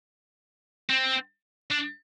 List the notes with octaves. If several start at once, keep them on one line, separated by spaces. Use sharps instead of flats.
C4
D4